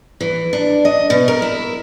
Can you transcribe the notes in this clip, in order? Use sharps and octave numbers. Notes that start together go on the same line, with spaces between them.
E3
D4
D#5
B2
A#4
E4